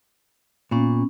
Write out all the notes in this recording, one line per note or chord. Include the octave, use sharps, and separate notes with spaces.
A#2 B3 C#4